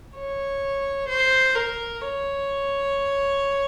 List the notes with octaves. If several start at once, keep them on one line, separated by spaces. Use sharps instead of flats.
C#5
C5
A#4
C#5